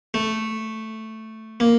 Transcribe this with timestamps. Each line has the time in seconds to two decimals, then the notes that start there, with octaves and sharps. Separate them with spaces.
0.14 A3
1.60 A#3